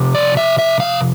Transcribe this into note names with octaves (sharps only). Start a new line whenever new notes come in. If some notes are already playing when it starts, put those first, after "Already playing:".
Already playing: F2 C3
D5
E5
E5
F5